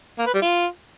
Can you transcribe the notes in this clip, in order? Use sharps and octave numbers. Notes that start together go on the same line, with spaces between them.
A#3
B4
G3
F4